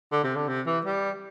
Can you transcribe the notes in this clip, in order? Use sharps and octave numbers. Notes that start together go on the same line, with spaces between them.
D3
C3
D3
C3
E3
G3